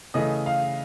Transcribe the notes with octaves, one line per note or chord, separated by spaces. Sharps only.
C#3 E3 A3 D#5
F5